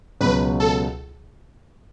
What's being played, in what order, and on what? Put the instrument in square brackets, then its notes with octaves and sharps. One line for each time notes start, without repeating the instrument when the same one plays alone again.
[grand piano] C#2 B2 F#3 [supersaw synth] B4
[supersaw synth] A4